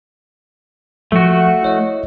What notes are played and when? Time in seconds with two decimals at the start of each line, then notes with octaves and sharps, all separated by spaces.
1.12 F3 A3 F#4
1.63 E4 C#5 D#5